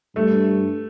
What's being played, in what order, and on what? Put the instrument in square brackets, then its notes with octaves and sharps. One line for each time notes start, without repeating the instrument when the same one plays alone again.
[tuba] G2 [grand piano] A3